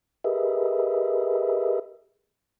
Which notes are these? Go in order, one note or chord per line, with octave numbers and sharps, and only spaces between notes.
G4 G#4 A#4 B4 D#5 E5